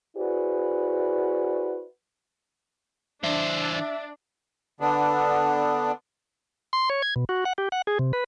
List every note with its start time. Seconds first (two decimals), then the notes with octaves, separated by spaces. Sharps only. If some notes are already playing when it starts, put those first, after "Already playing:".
0.17 E4 F#4 G#4 B4 C5 D5
3.23 E3 D4 C5 E5
4.80 D3 B3 D4
6.73 C6
6.90 C#5
7.02 G#6
7.16 B2
7.29 F#4
7.45 F#5
7.58 G4
7.72 F#5
7.87 G#4
7.99 C3
8.13 B4